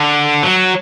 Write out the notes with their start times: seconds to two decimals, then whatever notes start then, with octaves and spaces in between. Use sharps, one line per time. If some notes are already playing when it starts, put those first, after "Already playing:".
Already playing: D3
0.43 F#3